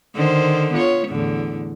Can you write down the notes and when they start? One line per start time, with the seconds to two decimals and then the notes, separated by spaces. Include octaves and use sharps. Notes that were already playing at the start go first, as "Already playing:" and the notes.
0.15 D3 D#3 C5
0.74 B3 F4 C#5
1.08 E2 A2 D3